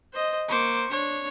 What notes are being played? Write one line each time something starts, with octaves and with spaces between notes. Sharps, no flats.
C5 D#5
A#3 C5 C#6 D6
D4 C#5